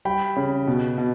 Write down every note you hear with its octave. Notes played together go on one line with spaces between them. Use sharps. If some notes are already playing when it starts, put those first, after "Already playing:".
G3 G5 B5
C#3
B2
B2